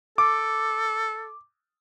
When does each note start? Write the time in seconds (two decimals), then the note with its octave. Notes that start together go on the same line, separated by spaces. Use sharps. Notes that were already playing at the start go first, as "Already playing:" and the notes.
0.18 A4 D6